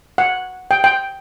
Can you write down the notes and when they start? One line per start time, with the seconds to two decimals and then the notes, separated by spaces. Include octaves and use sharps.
0.18 F#5
0.71 G5
0.84 G5